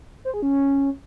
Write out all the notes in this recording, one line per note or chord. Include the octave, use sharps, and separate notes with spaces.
C5
G#4
C#4